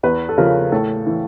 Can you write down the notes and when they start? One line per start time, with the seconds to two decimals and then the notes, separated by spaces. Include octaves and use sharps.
0.03 E2 B4
0.29 A4
0.38 C#3 F3 A#4
0.72 A2 A4
1.07 E3